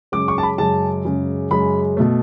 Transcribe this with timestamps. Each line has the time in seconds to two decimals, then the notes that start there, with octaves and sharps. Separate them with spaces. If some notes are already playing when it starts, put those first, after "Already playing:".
0.12 F#2 C#3 G#3 D6
0.28 C#6
0.38 A5
0.43 B5
0.58 F#2 C#3 G#3 A5
1.05 F#2 C#3 G#3
1.51 F#2 C#3 G#3 B5
1.97 B2 A3